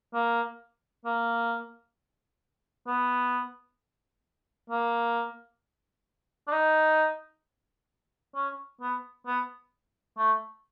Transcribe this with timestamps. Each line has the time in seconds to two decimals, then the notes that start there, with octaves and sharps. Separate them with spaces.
0.14 A#3
1.05 A#3
2.87 B3
4.70 A#3
6.47 D4
6.52 D#4
8.35 C#4
8.81 B3
9.27 B3
10.18 A3